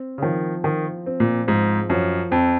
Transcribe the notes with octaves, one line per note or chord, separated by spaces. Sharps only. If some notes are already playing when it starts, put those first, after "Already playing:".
Already playing: C4
C#3
D#3 F3
D#3 F3
C4
A#2
G#2 F3
F#2 F3
F2 C4